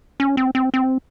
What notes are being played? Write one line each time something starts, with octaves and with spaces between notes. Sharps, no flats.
C#4
C4
C4
C4